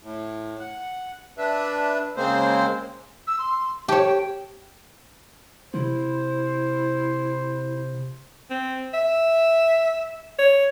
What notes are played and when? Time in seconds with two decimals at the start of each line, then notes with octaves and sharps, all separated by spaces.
0.03 A2
0.59 F#5
1.38 D4 B4 E5
2.17 C#3 G#3 A#3 C4 C5
3.27 E6
3.39 C6
3.88 G4 C#5 A5
4.06 G5
5.74 C3 E4 C5
8.50 C4
8.94 E5
10.38 C#5